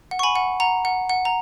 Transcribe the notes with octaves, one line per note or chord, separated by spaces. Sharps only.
F#5
C#6
G#5 B5
F#5
F#5 A#5
F#5
F#5
A#5